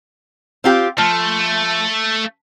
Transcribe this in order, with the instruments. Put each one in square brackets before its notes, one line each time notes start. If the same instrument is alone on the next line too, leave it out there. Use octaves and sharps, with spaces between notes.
[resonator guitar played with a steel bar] C4 F4 G4
[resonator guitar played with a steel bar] F3 [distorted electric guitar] A3